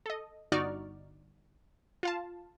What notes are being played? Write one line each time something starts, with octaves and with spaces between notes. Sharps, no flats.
A4 D#5
G1 D#4 F#4 D5 C#6 F6
F4 F5 A5